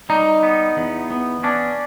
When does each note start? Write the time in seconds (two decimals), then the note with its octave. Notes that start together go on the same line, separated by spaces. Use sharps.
0.09 G3 D#4
0.43 B3
0.77 E2
1.11 B3
1.43 C#4 D4